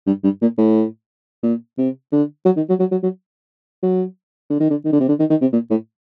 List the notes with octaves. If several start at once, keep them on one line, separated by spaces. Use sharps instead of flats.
G2
G2
A#2
A2
A#2
C3
D3
F#3
D#3
F#3
F#3
F#3
F#3
F#3
D3
D#3
D3
D#3
D3
C3
D3
D#3
D#3
C3
A#2
A2